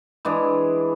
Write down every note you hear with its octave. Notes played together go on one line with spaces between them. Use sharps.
E3 G#3 D4 G#4